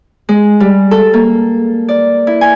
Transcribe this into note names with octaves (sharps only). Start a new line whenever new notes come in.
G#3
G3
A4
A#3
D5
E4
G#5